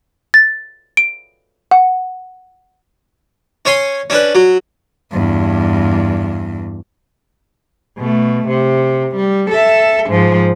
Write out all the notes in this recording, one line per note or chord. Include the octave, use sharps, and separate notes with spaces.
A6
D7
F#5
C#4 C#5 G#5 C6
C#4 D4 B4
F#3
E2 G2
B2 A3
C3
G3
A4 E5
G#2 F3